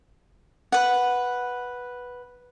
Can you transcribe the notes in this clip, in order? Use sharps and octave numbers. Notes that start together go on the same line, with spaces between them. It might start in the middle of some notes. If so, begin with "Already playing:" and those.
B4 F#5